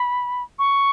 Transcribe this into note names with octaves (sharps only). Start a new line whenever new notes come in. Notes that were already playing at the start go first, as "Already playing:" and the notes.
Already playing: B5
C#6